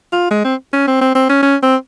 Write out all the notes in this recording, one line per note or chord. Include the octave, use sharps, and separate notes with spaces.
F4
G#3
C4
C#4
C4
C4
C4
C#4
C#4
C4